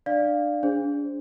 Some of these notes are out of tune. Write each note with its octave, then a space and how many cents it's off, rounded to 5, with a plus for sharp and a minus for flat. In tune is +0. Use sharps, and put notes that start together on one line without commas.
D4 +25 D5 +0 F5 +0
D4 -30 G#4 -10 C5 +0